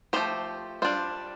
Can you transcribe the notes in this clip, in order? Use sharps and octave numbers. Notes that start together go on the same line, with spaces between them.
F3 A3 C4 G4 C5
G3 D4 F4 C5